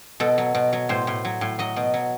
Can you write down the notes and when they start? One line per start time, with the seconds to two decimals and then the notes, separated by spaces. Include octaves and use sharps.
0.20 B2 A4
0.38 F#3
0.55 B2
0.73 F#3
0.89 A2 C5
1.07 A2
1.25 F#3
1.41 A2
1.59 F#3 D#5
1.76 B2
1.94 F#3